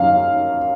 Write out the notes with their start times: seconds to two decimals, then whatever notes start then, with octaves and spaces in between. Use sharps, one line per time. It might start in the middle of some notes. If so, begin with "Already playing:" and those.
Already playing: F#2 D#3 F#3 F5